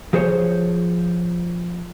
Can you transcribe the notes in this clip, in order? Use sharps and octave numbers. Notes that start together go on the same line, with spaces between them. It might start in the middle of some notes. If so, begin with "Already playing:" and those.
F3 G#4 C5 C#5